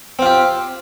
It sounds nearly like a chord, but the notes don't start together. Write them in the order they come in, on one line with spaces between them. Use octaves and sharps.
C4 F4 G4